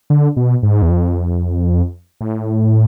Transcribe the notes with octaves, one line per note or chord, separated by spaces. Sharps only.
D3
B2
G#2
E2
F2
A2